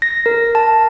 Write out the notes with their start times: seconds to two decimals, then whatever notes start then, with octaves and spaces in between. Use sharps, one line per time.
0.02 A#6
0.26 A#4
0.55 A5